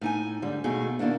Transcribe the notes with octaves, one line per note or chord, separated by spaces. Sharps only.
A2 D#4 G#5
G#2 D3 G3
D#2 B2 A3 D#4 G#4
B2 D#3 A#3 D4 E4